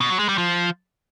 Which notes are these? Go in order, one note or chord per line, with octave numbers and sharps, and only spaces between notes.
B2
F#3
G#3
G3
F3